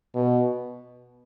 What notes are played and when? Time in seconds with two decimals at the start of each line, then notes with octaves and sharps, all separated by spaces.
0.15 B2